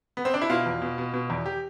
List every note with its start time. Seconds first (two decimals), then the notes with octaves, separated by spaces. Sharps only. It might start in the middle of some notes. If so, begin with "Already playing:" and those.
0.17 B3
0.25 C4
0.34 D4
0.42 E4
0.50 B2 F4
0.66 E2
0.82 B2
0.98 B2
1.14 B2
1.30 E2
1.46 G4